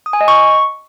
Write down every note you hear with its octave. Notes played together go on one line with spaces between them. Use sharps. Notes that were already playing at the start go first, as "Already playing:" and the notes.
D#6
G#5
D#5
C#6